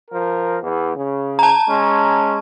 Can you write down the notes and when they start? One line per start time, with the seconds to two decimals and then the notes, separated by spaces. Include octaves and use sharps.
0.11 F3 A#4
0.62 E2
0.97 C#3
1.39 A5 A#5
1.69 G#3 C#4